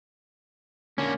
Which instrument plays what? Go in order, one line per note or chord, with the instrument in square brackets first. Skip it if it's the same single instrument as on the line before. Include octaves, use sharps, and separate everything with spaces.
[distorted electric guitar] D3 A#3 [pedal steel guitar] C#4